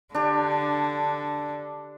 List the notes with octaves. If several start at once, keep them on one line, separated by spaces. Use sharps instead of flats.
D3 D4 G4